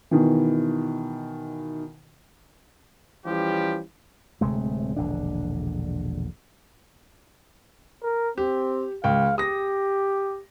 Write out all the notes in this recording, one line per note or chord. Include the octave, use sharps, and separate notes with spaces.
B2 D#3 E3
E3 F3 G3 C#4 G4
D1 C3 G#3 A3
E1 A#1 D3 D4
A#4
C4 G4
C#2 F5 G5
G4 D#6 A#6